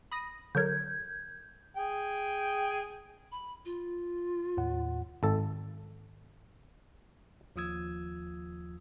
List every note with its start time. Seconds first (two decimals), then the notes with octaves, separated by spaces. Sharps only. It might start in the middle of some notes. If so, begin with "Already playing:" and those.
0.12 B5 D#6 A#6
0.55 D3 F#3 A#4 G6 G#6
1.77 G#4 G5
3.32 B5
3.65 F4
4.57 D#2 A2 F#5
5.23 G#1 A4
7.56 D#2 F3 F4 D#6 E6 G#6